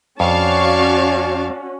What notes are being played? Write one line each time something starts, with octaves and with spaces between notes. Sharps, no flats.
F2 C#4 F#4 D5 F5 A5 C#6